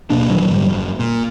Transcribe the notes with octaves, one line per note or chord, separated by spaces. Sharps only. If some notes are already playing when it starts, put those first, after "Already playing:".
D1 B2 A#3 D4
A#2 D#3 E3 F#3
G#2 D3 F#3 G3
F#1
A#2